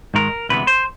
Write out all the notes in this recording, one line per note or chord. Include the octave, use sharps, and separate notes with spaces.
G#2 D#3 G#3 A#4
D2 C3 E3 G#3 B3 B4
C5